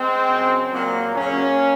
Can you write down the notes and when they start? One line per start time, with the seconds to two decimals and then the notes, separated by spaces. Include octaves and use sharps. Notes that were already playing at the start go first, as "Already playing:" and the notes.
Already playing: G#3 C4
0.27 F#2 C#3 F#3
0.72 A#2 F#3 A#3
1.15 F#2 C#3 F#3 A#3 C#4